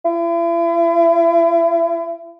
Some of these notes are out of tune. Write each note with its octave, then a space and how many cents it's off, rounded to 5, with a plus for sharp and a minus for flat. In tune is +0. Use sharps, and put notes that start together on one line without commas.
E4 +40